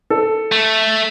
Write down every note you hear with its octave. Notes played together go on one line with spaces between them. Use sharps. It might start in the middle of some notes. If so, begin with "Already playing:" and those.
A4
A3